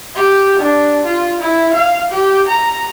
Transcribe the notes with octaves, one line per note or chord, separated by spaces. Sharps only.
G4
D4
F4
E4
F5
G4
A#5